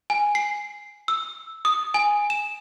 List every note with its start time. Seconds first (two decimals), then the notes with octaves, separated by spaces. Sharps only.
0.10 G#5
0.35 C7
1.08 E6
1.65 D#6
1.94 G#5
2.30 E7